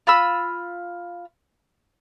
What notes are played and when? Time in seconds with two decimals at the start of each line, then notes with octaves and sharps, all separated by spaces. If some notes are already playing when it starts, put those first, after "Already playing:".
0.07 F4 B5 E6